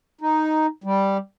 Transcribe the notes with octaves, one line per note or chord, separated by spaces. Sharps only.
D#4
G3